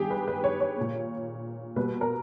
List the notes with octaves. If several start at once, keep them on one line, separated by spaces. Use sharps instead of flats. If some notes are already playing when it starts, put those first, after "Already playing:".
Already playing: G2 D#3 G#3 B3 G4 G#4
B4
B4
C#5
C#5
A#2 A#3
B2 G3 A#3 B4
A#4